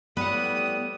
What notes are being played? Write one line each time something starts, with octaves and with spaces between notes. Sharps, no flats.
A2 E3 G3 B3 B4 F#5 D#6